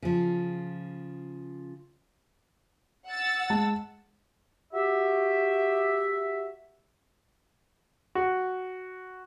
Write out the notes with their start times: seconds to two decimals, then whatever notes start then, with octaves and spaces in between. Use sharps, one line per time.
0.02 C#3 F3
3.07 F#5 E6 A6
3.50 G#3 A5
4.73 F#4 G4 E5
8.15 F#4